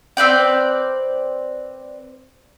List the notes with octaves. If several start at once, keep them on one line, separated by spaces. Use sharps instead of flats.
C4 B4 D5 G5